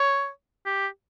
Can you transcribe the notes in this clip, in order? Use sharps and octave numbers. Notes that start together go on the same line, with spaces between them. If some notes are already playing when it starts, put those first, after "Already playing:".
Already playing: C#5
G4